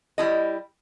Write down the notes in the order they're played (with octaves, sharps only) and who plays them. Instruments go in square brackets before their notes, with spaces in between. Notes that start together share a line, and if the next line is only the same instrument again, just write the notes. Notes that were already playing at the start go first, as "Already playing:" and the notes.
[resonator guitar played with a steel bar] G3 E4 D#5